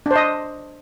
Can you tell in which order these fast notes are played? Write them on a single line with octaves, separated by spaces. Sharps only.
D4 C5 D#5